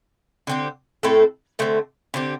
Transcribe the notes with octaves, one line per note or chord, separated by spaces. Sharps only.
D3 C4 G4
A2 A3 C4 A4
D3 A3 C4
D3 C4 G4